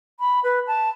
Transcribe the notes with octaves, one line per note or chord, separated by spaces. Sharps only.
B5
B4
A5